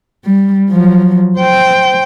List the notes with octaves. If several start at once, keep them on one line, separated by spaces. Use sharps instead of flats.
G3
F3 F#3
C5 G5